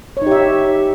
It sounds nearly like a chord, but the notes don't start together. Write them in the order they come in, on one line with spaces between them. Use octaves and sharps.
C#5 D#4 G4 E5